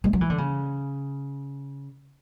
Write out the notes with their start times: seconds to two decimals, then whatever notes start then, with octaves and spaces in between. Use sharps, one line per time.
0.04 G3
0.13 F#3
0.21 E3
0.30 D3
0.38 C#3